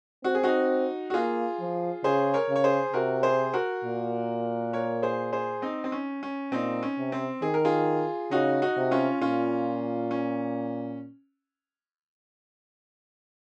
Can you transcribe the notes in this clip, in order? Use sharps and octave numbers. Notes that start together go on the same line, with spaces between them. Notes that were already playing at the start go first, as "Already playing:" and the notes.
C4 F#4
G#4
D#4 F#4
F#4
A#3 F4 G#4
F3
C#3 G#4 C5
A#4 C#5
C#3
C#5
G#4 C5
C3 F#4 A#4
G#4 C5
F#4 A#4
A#2
A#4 C#5
G#4 C5
G#4 C5
C4 D#4
C4
C#4
C#4
A#2 C4 D#4
C#4
C3
C4
D#3 G#4
A#4
F4 G#4
C#3 D#4 F#4
D#4 F#4
C3
C#4 F4
A#2 C#4 F4
C#4